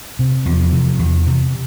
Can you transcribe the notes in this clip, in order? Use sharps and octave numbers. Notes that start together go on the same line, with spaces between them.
C3
E2 F3
C3
E2
C3